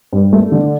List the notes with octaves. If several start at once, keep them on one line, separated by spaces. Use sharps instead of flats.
G2
A3
D3